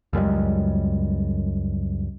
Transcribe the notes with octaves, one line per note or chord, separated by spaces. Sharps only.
C#2 F#2 G3 G#3